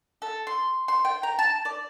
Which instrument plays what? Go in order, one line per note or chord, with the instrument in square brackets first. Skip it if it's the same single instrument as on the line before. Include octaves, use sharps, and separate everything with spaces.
[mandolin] A4
C6
C6
G5
A#5
A5
D5